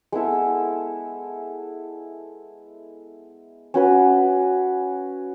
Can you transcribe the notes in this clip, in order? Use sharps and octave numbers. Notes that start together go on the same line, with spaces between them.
G#3 B3 E4 A4
C#4 F#4 B4